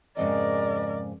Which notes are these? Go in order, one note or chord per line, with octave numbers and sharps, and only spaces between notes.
F2 G#2 C#3 A#4 D5 D#5